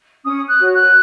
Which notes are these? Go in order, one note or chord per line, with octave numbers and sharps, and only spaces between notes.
C#4 D#6
F#6
F#4 C#5
F#6